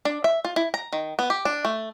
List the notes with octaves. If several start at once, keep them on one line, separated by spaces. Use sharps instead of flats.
D4
E5
F4
E4
A#5
D#3
B3
G4
D4
A3